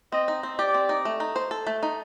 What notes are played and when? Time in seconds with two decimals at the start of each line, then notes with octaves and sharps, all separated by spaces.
0.12 C4 D#5
0.28 D#4
0.43 C4
0.58 G4 D5
0.74 C4
0.89 D#4
1.05 A3
1.20 D#4
1.36 C5
1.51 A4
1.67 A3
1.83 D#4